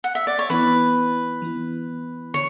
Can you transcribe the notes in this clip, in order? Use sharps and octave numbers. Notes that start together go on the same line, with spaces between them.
F#5
E5
D5
C#5
E3 B3 E4 B4
E3 B3 E4
D3 C#5